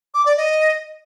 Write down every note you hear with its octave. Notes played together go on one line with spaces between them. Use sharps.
D6
D5
D#5